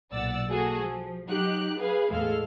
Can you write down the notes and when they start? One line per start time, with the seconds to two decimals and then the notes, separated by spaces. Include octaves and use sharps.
0.12 B1 A#2 D5 F#5 E6 A6
0.49 A#3 F#4 G#4 A4
0.83 F3
1.28 F#3 D#4 G4 F#6
1.78 G#4 B4 F5
2.10 E2 A2 G#3 A4 F5 F6